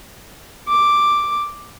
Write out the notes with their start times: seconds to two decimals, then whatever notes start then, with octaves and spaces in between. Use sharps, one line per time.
0.68 D6